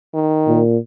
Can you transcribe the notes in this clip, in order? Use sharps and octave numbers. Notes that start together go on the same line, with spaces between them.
D#3
A#2